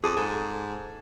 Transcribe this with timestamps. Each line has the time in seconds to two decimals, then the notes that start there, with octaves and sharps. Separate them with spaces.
0.04 F2 G#4 A5 D6 D#6
0.17 G#2 A4 G#5